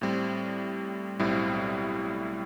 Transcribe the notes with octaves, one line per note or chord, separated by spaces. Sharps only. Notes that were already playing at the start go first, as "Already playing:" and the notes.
A2 G3 C4
B1 A2 G3 C4 E4